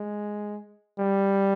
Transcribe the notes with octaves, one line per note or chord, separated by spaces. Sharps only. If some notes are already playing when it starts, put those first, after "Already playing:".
Already playing: G#3
G3